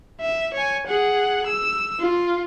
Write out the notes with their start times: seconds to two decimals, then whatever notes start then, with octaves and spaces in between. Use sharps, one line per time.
0.20 E5
0.54 C#5 G#5
0.86 G#4 F#5
1.47 E6
1.99 F4